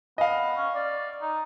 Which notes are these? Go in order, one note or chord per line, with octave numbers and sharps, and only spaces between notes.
B3 D#5 F5
C#4
D5
D#4